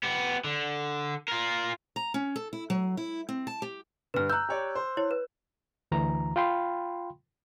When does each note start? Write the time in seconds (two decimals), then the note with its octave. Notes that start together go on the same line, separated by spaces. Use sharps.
0.03 B3 G4
0.44 D3
1.28 F4 A#4
1.96 A#5
2.14 C#4
2.36 A4
2.53 E4
2.70 F#3
2.97 E4
3.29 C4
3.47 A5
3.62 G4
4.14 G2 D3 B4 F6
4.30 A#5 E6 F#6 G6
4.49 G4 C#5 D5
4.75 C5
4.97 E4 C#5
5.11 B4
5.91 D2 E3 A#5
6.36 F4 F5 G5 B5 C6